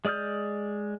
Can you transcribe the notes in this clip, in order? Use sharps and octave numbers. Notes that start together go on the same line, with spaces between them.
G#3 D5 D#6 F6 G6